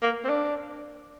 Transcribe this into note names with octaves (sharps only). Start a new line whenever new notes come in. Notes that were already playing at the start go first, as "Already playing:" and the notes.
A#3
C4
D4